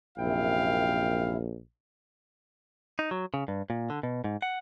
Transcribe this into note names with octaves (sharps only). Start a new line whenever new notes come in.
A#1 F#2 C3 E4 F5 G5
D#4
F#3
C#3
G2
A#2
D3
B2
G#2
F#5